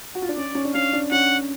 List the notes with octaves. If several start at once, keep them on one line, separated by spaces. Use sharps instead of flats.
F#4
F4
D4
C#4 D5
C#4
D4
C#4 F5
D4
C#4 F#5